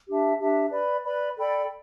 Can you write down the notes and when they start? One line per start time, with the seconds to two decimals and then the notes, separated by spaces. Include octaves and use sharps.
0.08 D4 G4 E5 A5
0.40 D4 G4 E5 A5
0.71 B4 D5 B5
1.04 B4 D5 B5
1.37 A4 D5 G5 B5